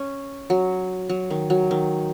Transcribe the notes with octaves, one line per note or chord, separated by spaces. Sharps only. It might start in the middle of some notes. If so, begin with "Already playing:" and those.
Already playing: C#4
F#3
F#3
D#3
F#3
D#3